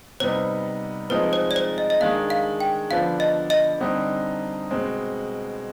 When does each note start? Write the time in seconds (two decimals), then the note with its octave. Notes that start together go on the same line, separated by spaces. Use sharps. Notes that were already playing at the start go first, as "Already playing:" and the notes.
0.20 C3 G3 B3 D#4 C5
1.10 F3 G#3 C4 D#4 B4
1.33 C5
1.51 D5
1.56 C5
1.78 D#5
1.90 D#5
2.00 D#3 G#3 D4 F5
2.30 F5
2.60 G5
2.90 D3 F3 B3 D4 F5
3.20 D#5
3.50 D#5
3.80 D3 G3 C4 D#4
4.71 B2 G#3 C4